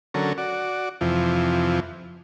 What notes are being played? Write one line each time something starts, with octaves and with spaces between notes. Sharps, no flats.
D3 F#3 C#4 A4 A#4
F#4 D5
F2 C3 E3 F3